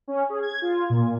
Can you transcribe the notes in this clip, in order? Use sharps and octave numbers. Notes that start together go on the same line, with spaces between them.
C#4
G#4
G#6
F4
A#2